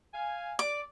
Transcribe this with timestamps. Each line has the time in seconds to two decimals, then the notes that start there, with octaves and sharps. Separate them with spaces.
0.14 F5 G#5
0.59 D5 D6